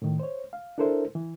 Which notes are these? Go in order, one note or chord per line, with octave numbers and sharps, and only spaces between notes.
A2 D#3
C5 C#5
F5
D4 E4 A4 A#4 C5 E5
E3